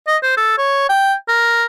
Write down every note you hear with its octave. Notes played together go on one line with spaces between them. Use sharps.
D#5
C5
A4
C#5
G5
A#4